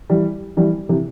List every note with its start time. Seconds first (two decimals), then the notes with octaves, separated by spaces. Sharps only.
0.10 E3 G3
0.57 E3 G3
0.89 C3 E3